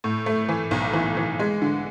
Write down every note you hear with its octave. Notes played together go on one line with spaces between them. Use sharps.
A2
A3
E3
B1
E3
E3
G#3
D3